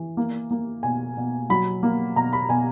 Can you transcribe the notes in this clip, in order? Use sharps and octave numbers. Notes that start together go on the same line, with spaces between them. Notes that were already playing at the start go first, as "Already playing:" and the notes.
Already playing: E3
A#3
A#3
B2 G#5
B2
F#3 B5
A#3
B2 A#5
B5
B2 G#5